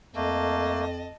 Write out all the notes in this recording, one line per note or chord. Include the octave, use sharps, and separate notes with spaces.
F2 A3 A#3 D#5 A5